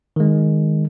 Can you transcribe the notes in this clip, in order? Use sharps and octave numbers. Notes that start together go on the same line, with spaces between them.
D#3 G#3